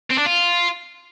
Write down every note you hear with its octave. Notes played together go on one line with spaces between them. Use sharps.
C4
D4
F4